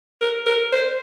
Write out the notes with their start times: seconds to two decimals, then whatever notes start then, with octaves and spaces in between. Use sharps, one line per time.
0.21 A#4
0.46 A#4
0.73 C5